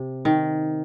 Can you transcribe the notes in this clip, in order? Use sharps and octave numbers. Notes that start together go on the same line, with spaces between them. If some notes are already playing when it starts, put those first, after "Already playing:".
Already playing: C3
D#3